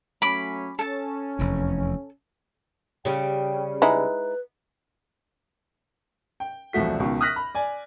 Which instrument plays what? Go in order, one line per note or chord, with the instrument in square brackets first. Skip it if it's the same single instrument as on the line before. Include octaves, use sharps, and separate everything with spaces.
[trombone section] F#3 A3 C#4 [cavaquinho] B5 D6
[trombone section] C#4 [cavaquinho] A4 A5
[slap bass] F1 E2
[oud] C#3 G3 [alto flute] G5
[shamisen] G#3 D#4 E4 [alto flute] B4
[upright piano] G5
E1 C2 F3 A3 F#4 B6
C#2 B2 D#3
D#6 F6 F#6 A#6 B6
B5
D5 G#5